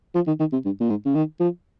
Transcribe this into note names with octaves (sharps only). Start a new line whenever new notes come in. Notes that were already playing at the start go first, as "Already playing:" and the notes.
F3
D#3
D#3
C3
G2
A#2
G#2
C#3
D#3
F3